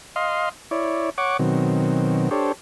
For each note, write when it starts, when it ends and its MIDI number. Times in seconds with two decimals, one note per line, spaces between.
0.16 0.49 75
0.16 0.49 77
0.16 0.49 84
0.71 1.10 64
0.71 1.10 73
0.71 1.10 74
1.18 1.37 73
1.18 1.37 78
1.18 1.37 85
1.18 1.37 86
1.39 2.30 47
1.39 2.30 51
1.39 2.30 54
1.39 2.30 60
2.31 2.52 62
2.31 2.52 67
2.31 2.52 69
2.31 2.52 72
2.31 2.52 73